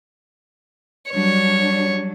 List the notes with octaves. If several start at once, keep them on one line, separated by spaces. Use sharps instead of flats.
F#3 G3 D4 C#5